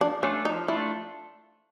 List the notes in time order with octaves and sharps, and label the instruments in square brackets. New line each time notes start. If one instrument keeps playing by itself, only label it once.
[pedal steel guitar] F3 [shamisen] D4
[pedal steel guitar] A3 D4 F4 A4 [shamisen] C#4
[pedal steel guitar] F3 [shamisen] D#4
[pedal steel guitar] A3 D4 F4 A4 [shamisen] E4